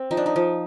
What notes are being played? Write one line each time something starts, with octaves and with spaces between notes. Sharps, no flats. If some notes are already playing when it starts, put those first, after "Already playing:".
Already playing: C4
F3 D#4
D4
D#4
F3